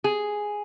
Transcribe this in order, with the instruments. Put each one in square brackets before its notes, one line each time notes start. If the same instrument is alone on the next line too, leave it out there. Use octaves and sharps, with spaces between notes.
[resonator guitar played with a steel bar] G#4